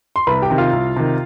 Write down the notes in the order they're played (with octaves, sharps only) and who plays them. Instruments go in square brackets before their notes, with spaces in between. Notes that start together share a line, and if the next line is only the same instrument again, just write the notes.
[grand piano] C6
C2 B4 B5
G4 G5
C3 D#3
F4 F5
C2
C3 D#3